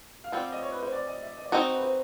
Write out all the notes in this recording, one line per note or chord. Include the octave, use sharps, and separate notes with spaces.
F5
G3 C4 F4 F#5
D#5
C#5
B4
C5
D5
D#5
E5
D#5
D5
C4 D#4 F#4 D#5
B4
C5